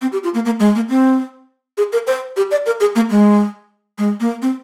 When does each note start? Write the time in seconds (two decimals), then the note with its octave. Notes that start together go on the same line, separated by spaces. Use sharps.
0.02 C4
0.12 G4
0.24 F4
0.34 A#3
0.45 A#3
0.60 G#3
0.75 A#3
0.89 C4
1.77 G#4
1.93 A#4
2.07 C5
2.36 G4
2.51 D5
2.66 A#4
2.80 G#4
2.95 A#3
3.10 G#3
3.98 G#3
4.20 A#3
4.42 C4